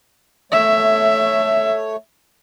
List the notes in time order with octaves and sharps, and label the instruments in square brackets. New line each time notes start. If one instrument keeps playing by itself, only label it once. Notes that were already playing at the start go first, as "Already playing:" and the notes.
[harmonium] A3 C#5 [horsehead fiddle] E5